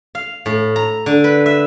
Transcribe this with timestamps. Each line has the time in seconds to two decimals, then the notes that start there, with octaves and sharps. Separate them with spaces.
0.15 F5
0.46 A2
0.76 A#5
1.06 D3
1.24 B4
1.46 E5